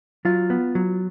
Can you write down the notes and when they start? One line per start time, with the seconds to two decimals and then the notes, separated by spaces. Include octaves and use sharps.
0.25 F#3 F4
0.50 B3
0.75 F#3